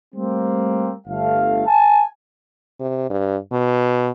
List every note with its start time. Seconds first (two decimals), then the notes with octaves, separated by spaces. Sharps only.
0.14 G3 A3 A#3 C4
1.07 G1 A3 F5
1.67 G#5 A5
2.80 C3
3.10 G2
3.52 B2